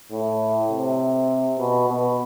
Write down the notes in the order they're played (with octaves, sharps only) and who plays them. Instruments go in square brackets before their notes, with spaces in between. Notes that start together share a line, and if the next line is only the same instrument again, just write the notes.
[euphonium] A2
C3
B2
B2